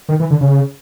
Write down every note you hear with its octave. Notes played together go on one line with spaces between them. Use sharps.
D#3
E3
D3
C#3